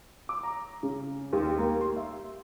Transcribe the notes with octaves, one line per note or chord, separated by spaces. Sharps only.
D6
A#5
C#3
D#2
A#3
C6
E5